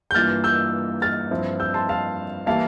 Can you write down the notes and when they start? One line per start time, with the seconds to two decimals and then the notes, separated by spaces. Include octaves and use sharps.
0.11 G6
0.14 G2 E3 A#3 F4 F6 A6
0.44 E6 G6
1.02 F6 A6
1.31 G2 F3 C4 E4
1.60 E6 G6
1.74 A5 C6
1.89 F5 A5
2.46 E3 G3 A#3 E4 F5 A5